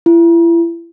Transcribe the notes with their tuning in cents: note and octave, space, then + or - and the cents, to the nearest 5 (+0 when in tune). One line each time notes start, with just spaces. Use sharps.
E4 +35